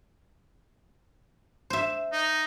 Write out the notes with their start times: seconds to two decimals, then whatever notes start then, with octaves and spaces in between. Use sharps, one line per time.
1.70 C5 E5
2.13 D#4